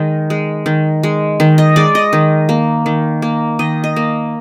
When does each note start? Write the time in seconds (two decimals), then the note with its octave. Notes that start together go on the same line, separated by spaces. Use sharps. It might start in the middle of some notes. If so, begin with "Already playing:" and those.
Already playing: D#3 G#3 D#5
0.30 G#3
0.66 D#3
1.03 G#3
1.40 D#3
1.58 D#5
1.76 G#3 D5
1.95 D#5
2.13 D#3
2.49 A#3
2.86 D#3
3.22 A#3
3.59 D#3 D#5
3.84 D#5
3.96 A#3